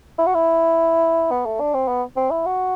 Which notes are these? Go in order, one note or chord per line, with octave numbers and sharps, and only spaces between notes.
E4
F#4
E4
B3
A3
D4
C4
B3
C4
E4
F#4